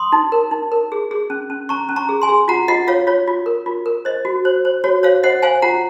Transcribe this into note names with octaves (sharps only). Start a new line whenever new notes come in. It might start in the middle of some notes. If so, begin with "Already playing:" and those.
Already playing: C6 D#6
D#4
A#4
D#4
A#4
G#4
G#4
C#4
C#4
C#4 A#5 C#6
C#4
A#5 C#6
G#4
G#5 C6
G#4
F4 F#5 A#5
F4 D#5 F#5
F4 C#5 F5
F4 C#5
F4
A#4
F4
A#4
C5 D#5
F#4
C5
C5
F#4 C#5
C5 C#5 F5
C5 D#5 F#5
C5 F5 G#5
F4 F#5 A#5